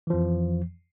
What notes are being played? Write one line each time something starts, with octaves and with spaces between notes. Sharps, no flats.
F2 E3 F3